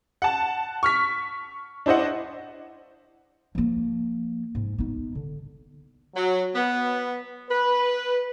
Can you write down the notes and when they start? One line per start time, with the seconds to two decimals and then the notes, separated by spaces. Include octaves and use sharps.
0.22 F#5 A5
0.83 C#6 F6 B6
1.86 D4 E4 C5 D#5 F#5
3.55 F3 A#3
4.55 G#2
4.78 B3 D#4
5.15 D3
6.15 F#3
6.54 B3
7.49 B4